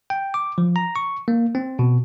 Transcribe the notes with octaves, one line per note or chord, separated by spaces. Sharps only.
G5
D6
F3
A#5
C#6
A#3
C4
B2